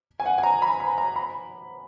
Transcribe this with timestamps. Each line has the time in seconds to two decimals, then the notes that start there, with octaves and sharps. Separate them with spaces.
0.20 G#5
0.26 F#5
0.38 G#5
0.43 A#5
0.62 B5
0.80 B5
0.98 A#5
1.16 B5